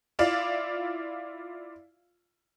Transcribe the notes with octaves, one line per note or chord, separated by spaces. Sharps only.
E4 F4 D5 F5